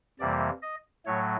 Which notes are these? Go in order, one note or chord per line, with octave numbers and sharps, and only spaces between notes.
F2 C3 E3 G3 A#3 D5
D#5
A2 F#3 A3 C#5